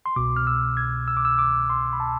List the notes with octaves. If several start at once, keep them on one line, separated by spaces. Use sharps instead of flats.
C6
C2 B2 D6
F6
E6
G#6
E6
D6
E6
D6
C6
B5
A5